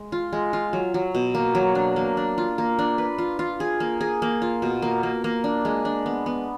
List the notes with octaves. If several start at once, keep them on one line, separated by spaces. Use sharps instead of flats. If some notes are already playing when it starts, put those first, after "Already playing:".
Already playing: G#3
F4
G#3
F4
F#3
F#3
B2
A#3
F#3
D4
A#3
D4
F4
A#3
D4
B4
F4
F4
G#4
A#3
G#4
A#3
F4
B2
A#3
A#3
A#3
D4
G#3
D4
B3
B3